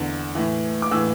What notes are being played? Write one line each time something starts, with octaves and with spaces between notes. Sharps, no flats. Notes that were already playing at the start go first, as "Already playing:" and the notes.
Already playing: E2 D3
A2 E3
D6
A2 E3 E6